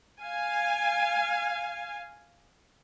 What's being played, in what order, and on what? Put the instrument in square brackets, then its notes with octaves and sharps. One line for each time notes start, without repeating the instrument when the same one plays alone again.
[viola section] F5 G#5